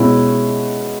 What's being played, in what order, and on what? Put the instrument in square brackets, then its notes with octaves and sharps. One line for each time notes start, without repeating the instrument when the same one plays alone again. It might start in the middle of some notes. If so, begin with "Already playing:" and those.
Already playing: [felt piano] B2 G#3 C#4 E4